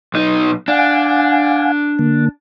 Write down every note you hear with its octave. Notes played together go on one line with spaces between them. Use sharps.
B1 D#4
D4 F5 F#5 G#5
D3 A#3